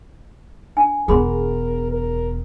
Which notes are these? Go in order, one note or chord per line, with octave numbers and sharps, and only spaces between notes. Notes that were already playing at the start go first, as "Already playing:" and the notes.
D4 G#5
E1 B3 G#4 A#4 B5 C6
A#4